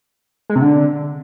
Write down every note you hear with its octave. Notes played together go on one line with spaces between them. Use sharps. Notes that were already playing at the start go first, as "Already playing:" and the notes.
G#3
C3
D3